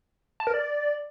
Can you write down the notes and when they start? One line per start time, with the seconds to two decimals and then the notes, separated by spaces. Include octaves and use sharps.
0.40 A5
0.47 A#4
0.54 D5